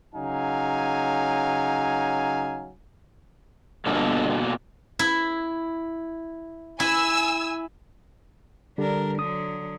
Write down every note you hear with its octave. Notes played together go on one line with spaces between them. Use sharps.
C#3 F#3 D#4 F5 G#5
G1 B2 A#3 A4
E4
E4 G#5 E6
D3 G3 D4 A#4
D3 F#3 D#6